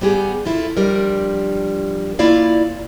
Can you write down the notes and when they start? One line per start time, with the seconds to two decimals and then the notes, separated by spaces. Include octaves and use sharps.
0.01 G3 B3 G4 G#4
0.45 E4 F4 A4
0.77 F3 G3 D4 A#4
2.19 A#3 E4 F4 D5 F5